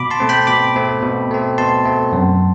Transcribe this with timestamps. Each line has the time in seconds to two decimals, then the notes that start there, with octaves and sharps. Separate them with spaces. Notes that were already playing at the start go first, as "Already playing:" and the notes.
Already playing: B2 B5 D6
0.11 A5 C6
0.20 A3 C4
0.29 G5 B5
0.47 B2 B5 D6
0.76 A3 C4
1.03 B2
1.31 A3 C4
1.58 B2 A5 C6
1.85 A3 C4
2.13 F#2